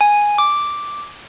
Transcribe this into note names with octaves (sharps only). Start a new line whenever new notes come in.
G#5
D6